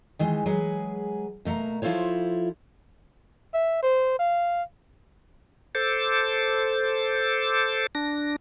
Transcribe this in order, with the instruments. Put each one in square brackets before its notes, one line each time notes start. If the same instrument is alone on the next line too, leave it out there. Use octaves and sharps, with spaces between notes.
[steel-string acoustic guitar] D#3 E3 G#3
F#3 G#3 G#4 B4
B2 A3 A#3 A#5
F3 E4 F4 A4 C5 C#5
[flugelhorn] E5
C5
F5
[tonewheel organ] A4 C5 D6
D4 A#6